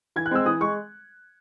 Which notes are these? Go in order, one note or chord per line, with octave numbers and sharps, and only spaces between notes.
E3 G#6
F#6
G#3 C4 E6
E3 D#6
G#3 C#6